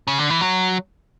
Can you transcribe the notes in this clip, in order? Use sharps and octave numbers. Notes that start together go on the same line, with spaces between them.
C#3
D3
E3
F#3